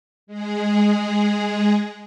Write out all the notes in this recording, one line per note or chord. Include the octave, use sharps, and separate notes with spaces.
G#3 G#4